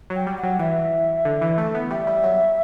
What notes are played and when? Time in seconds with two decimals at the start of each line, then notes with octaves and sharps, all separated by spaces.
0.10 F#3
0.16 G5
0.27 G3
0.38 F#5
0.43 F#3
0.59 E3 E5
1.25 D3
1.41 E3
1.58 A3
1.75 B3
1.91 G3 E5
2.07 G3
2.24 F#3